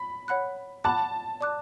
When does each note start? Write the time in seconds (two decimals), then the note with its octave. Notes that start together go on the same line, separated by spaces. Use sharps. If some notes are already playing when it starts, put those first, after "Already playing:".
Already playing: B5
0.28 C#5 F#5 B5 F#6
0.84 F#5 A5 B5 D6 F#6
1.41 D5 A5 D6 F#6